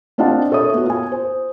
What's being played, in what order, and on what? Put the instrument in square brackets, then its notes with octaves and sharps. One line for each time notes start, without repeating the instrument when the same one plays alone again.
[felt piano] C4 D4 F4 D#5 F#5 A5
A4 C#5 E5 D#6
B3 F#4
F4 G#5
C5